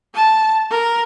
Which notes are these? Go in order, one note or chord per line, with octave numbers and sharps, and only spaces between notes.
A5
A#4